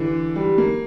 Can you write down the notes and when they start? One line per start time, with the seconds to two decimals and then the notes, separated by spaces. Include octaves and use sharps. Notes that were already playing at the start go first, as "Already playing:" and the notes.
Already playing: D3 E3
0.36 G3
0.58 A#3